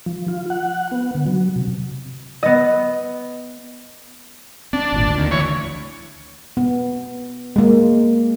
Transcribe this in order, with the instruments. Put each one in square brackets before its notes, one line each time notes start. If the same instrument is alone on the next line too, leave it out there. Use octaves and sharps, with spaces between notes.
[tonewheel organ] F3
F4
F#5
B3
D3
F#3
C3
[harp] B3 D#5
[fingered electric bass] C4 [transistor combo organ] D4
[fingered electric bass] G#1 A#2
D2
[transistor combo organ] D#2
E3 C#5
[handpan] B3
G#3 A#3